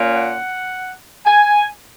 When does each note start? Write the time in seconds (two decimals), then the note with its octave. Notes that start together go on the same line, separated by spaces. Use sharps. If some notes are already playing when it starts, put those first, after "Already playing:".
Already playing: A#2 A#3 C#4
0.15 F#5
1.26 G#5